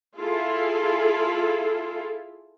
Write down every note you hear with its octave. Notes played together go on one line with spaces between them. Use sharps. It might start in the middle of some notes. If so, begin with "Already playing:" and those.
E4 F4 G#4 A4